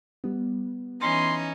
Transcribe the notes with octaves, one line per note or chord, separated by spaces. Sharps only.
G3 B3
E3 C#4 D#4 C6